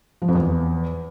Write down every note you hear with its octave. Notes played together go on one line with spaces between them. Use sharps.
F3
F2
E2